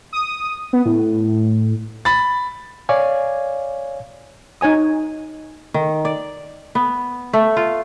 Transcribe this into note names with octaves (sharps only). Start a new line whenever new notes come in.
D#6
B3
A2
B5 A6
C#5 D5 F5 G#5
D#4 C#5 G#5 D#6
D#3
D5
B3
A3
F4